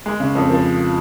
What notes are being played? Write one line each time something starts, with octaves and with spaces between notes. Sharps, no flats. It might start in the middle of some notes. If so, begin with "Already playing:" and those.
G#3
C#3
F2
F3